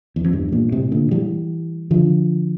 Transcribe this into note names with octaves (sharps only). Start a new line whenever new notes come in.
E2
F2
E2 G2
G2 A#2
A2 C3
A#2 D3
E3 G3
D3 F3